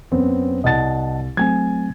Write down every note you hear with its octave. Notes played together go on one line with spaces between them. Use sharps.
F#2 B3 C4
C2 D#5 F#5 A5 A6
F#3 A3 C4 G#5 G#6